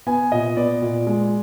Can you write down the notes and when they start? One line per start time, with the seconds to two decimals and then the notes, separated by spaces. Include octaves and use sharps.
0.07 B3 G#5
0.32 A#2 D#5
0.57 B3 D5
0.82 A#2
1.07 G#3